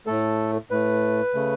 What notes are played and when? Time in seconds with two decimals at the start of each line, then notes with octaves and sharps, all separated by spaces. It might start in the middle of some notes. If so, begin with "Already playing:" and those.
0.07 A2 A3 A4
0.71 A2 A3 B4
1.34 C#3 A3